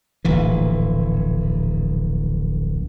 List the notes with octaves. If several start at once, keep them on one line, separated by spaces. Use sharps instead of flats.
D1 A#1 E3